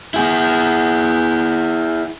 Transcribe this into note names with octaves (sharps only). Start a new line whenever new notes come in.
E4 G#4